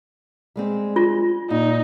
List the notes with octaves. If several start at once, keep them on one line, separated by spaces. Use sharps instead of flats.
G3 G#3 C4
F4
A#2 D#4